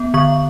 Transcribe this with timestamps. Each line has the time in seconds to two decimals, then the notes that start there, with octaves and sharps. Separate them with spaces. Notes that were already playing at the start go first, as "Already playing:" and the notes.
Already playing: B3
0.14 D3 C#6